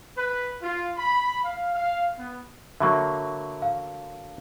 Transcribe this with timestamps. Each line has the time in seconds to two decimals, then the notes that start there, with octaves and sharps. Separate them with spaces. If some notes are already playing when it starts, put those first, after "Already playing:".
0.17 B4
0.62 F4
0.96 B5
1.43 F5
1.73 F5
2.18 B3
2.80 D3 F#3 A#3 E5 B5 C#6
3.62 F5